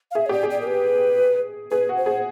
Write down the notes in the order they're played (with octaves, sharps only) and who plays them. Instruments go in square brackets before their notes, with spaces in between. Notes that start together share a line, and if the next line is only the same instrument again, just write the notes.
[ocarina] F5
[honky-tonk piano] G#4 [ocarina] E5
[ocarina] C#5
[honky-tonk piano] G4 [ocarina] D5
[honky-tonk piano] G#4
[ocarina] D5
A#4
B4
[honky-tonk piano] G#4 [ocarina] B4
[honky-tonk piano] F#4
[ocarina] C5
[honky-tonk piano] G#4